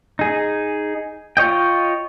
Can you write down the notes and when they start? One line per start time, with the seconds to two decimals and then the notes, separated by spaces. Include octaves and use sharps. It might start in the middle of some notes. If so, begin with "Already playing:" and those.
0.19 D#4 G#4
1.37 F4 C#5 D#5 G5